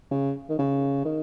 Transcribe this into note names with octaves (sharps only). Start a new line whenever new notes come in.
C#3
D#3
C#3
D#3